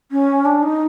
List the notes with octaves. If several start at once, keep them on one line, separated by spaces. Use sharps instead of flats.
C#4
D4
D#4